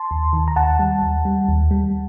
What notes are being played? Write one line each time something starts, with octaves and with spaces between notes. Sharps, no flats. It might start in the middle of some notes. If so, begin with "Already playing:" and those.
Already playing: A5 C6
D#2
D#3
A#5
D#2 F#5 A5
G3
D#2
G3
D#2
G3